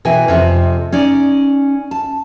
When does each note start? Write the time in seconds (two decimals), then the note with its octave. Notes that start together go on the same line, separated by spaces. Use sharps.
0.05 B2 E3 G5 G#5
0.28 F2 C3
0.92 C#4 D#4 D5
1.91 A5